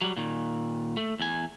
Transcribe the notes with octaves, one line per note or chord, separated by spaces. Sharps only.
F#3 G3
A#2 D#3
A3
E2 G#5